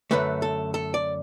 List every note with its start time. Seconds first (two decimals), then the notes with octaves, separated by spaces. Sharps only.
0.11 F#2 D3 A3 B4
0.42 A4
0.74 A4
0.94 D5